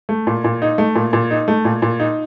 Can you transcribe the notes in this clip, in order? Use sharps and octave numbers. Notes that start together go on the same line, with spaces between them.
A3
A#2
A#2
D#4
A3
A#2
A#2
D#4
A3
A#2
A#2
D#4